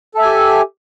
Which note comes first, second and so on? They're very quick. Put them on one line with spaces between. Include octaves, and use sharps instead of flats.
A4 E5 G#5 G4